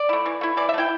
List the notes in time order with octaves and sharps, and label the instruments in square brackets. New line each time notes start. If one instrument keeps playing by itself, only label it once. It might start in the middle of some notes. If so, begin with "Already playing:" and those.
Already playing: [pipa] D5
A3 E4
E3
A3 E4
E3 D5
E5
A3
E4 G5